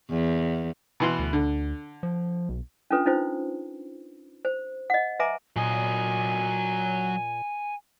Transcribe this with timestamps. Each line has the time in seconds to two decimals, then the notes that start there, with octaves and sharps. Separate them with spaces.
0.10 E2
1.00 B2 E3 C6
1.19 D2
1.33 D3
2.03 F3
2.49 B1
2.91 C#4 D4 F4 A4 B4
3.06 C#4 D#4 F4 C5
4.45 C5
4.90 D#5 F#5
5.19 B4 E5 G#5 A#5 C6 D6
5.56 A#2 F#3 D#5 G#5